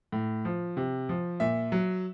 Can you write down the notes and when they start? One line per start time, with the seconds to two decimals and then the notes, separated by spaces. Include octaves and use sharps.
0.12 A2
0.45 F3
0.77 C3
1.09 F3
1.40 A#2 E5
1.72 F#3